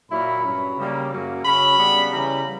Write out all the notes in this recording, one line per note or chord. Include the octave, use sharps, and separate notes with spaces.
A#2 F#3 A#3 E4 B5
G2 F#3 C#4
C#3 G3 A#3
F#2 C#3 F#3 A#3
C#3 F#3 C#4 B5
C#3 G3 B3 D4
C#3 E3 G3 A#5